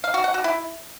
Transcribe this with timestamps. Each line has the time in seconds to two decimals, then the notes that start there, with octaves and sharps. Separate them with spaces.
0.04 F5
0.14 F#4
0.24 F#5
0.34 F#4
0.44 E4